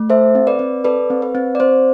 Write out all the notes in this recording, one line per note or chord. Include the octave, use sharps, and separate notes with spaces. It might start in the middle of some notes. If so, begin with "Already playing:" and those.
Already playing: A3
A4 C5 E5
C4
B4 D5
C4
A4 B4 D5
C4
B4
C4
D5
C4 C5